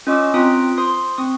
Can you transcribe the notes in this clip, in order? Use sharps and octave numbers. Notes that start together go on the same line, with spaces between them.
C#4 F4 D#5 C#6 D6 E6
C4 F4 A#5 D#6 D7
C5 C6 D#6
C4 C#6 D#6